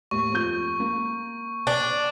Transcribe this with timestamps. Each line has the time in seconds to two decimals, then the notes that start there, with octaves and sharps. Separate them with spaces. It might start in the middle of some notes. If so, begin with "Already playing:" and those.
0.11 D#2 A2 C#6
0.32 F2 G6
0.80 A#3
1.67 D4